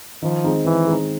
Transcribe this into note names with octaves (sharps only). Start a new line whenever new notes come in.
D#3 F3
G#3 C4 D#4
D#3 E3
G#3 C4 D#4